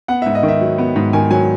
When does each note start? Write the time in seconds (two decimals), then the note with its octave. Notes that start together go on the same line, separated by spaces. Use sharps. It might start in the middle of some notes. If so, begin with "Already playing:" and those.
0.08 B3 F#5
0.22 G#2 E5
0.35 D#5
0.43 D#3
0.48 E5
0.61 F#3
0.78 B3
0.96 G#2
1.13 D#3 G#5
1.31 F#3 G#5